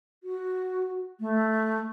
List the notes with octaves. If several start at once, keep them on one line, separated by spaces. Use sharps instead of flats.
F#4
A3